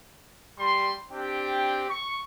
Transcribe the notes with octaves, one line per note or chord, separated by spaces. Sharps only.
G3 C6
C4 D4 G4 G5
C#6